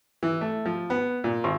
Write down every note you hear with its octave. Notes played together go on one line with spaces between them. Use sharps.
E3
A3
F3
B3
A#2
G#1